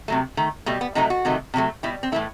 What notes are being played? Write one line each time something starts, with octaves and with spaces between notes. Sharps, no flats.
C3 F#3 A3
D#3 A3
B2 G3 A3
B3
C3 F#3 A3 D#4
F#4
C3 D#3 F#3 A3
C3 D#3 F#3 A3
B2 G3 E4
C4
A2 E3 A3 E4